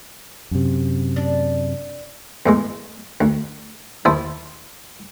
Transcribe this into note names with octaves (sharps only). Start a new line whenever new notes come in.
F#2 C3
D4
E2 A2 G#3
D2
D#2 E4 C5 E5 A5 D#6